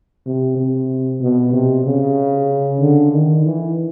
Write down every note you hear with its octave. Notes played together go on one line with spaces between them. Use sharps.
C3
C3
B2
C3
C#3
D3
D#3
E3